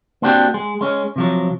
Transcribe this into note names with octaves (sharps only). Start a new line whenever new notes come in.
A#3 C4 D4 F#4 G4
G#3
G#3 C#4
C3 F3 F#3